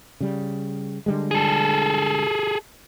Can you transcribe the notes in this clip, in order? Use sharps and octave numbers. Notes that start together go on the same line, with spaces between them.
C#3 G3
D3 G3 G#3
G#4 A4